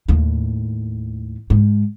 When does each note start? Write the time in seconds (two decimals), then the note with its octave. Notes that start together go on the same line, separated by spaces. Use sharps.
0.08 D#2 A2
1.50 G#2